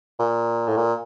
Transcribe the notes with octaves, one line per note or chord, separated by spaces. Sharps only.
A#2
A2
A#2